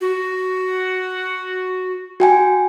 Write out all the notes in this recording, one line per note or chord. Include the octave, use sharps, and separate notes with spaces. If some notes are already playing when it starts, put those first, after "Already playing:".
F#4
F#4 G5 G#5